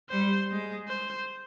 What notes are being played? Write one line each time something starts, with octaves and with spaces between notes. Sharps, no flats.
G3 C5
G#3
C5